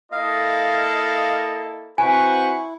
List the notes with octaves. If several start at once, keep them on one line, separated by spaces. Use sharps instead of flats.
A#3 E4 A4 D#5 F5
C4 E4 F#4 B4 C5 F#5 G#5 C#6